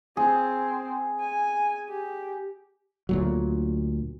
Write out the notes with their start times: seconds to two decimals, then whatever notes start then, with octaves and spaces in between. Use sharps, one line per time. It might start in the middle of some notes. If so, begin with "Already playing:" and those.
0.17 C4 G#4
1.20 G#5
1.89 G4
3.09 D2 A#2 F#3